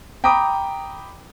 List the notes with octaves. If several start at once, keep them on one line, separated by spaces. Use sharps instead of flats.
G5 A#5 B5 D6 D#6